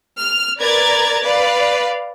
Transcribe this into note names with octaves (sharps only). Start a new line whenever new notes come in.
F6
A#4 B4 D5 A#5 G#6 A6
B4 D5 F5